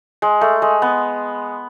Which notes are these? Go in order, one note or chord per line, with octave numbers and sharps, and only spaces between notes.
G#3
A3
G#3
B3